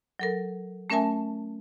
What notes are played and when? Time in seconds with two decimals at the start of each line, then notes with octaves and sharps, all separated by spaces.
0.19 F#3 A4 A#4
0.90 A3 C#4 A#4 E5 G#5 A5